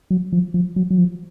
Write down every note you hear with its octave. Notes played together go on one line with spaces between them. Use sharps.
F#3
F3
F3
F#3
F#3
F3